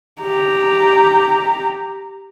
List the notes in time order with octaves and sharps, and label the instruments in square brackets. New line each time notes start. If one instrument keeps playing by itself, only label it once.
[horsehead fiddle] G4 A#5